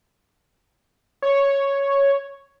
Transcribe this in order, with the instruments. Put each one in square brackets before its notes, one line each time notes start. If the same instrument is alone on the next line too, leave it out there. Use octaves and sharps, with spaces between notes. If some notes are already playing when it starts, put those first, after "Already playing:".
[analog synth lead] C#5